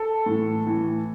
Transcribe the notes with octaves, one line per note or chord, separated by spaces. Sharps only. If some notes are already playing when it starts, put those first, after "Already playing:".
Already playing: A4
A2 E3
A2 E3